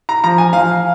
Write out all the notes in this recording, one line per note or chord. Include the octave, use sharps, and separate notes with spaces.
A#5
F3 A#5
G#5
F3 F5